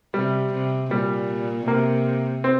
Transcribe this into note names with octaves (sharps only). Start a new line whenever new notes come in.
C3 G3
C3
A#2 G3
C3 A#3
C4